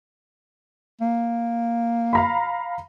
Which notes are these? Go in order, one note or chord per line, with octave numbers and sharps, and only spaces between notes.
A#3
F5 A#5 B5